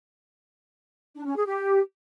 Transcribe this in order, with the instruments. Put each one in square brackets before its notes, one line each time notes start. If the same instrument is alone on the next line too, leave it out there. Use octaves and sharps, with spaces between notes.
[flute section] D4
C#4
G#4
G4